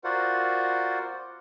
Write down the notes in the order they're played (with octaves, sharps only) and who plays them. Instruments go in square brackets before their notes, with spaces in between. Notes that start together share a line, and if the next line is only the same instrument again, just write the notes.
[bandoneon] F4 F#4 A#4 C5 D5 F#5